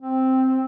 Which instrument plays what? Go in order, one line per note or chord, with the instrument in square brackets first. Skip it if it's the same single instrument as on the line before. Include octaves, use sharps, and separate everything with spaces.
[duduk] C4